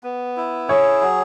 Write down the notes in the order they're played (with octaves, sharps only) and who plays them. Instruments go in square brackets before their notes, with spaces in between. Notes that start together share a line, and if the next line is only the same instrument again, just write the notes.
[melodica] B3
E4
[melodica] G#4 [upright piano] C#5
[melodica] F#3